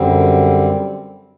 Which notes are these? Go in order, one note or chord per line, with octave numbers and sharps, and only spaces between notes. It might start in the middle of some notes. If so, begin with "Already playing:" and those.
Already playing: F#2 D3 G3 C4